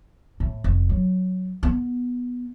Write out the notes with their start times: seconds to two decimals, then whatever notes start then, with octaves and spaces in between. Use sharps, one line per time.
0.40 A2
0.64 F1
0.89 F#3
1.63 B3